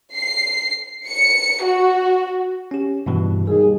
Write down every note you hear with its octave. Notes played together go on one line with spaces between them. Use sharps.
C7
C#7
F#4
C#4 G4
G2 B2 E3
D#2 G3 G#4